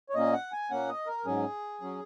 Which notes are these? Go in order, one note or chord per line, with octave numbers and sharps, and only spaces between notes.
C#5
A#2 A#3 C#4 D#5
F#5
G#5
A#2 A#3 C#4 F#5
D#5
A#4
G#2 F#3 C#4 G#4
F#3 C#4